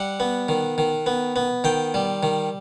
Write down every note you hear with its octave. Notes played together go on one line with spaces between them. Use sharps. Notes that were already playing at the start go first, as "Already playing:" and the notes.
Already playing: G3 F#5
B3
D#3
D#3
B3
B3
D#3 G5
G3
D#3